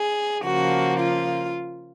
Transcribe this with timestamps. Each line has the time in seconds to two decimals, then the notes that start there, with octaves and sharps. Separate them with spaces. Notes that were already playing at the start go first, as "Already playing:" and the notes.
Already playing: G#4
0.43 C#3 F3 A#3 F#4
0.99 F4